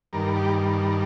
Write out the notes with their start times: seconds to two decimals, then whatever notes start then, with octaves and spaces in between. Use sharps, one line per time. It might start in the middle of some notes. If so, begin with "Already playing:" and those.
0.13 G2 D#3 G3 A#4
0.36 G4